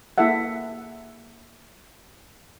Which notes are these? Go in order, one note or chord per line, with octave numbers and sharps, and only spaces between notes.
A#3 E4 G#4 A4 E5 F#5